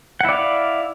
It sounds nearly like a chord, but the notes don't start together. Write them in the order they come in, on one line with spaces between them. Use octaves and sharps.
F#5 E4 D5 F5